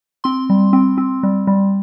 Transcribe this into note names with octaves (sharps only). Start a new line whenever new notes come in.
C4 C6
G3
C4
C4
G3
G3